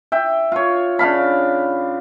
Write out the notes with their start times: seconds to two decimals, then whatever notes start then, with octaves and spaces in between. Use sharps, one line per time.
0.12 E5 G5
0.52 F4 C#5
0.99 C#3 D4 F5 B5